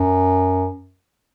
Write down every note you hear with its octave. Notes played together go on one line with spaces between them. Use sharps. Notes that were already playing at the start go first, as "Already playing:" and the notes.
Already playing: F#2